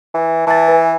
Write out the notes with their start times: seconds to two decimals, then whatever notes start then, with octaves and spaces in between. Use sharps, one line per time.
0.14 E3
0.47 E3 A5 A6
0.68 B4 G#5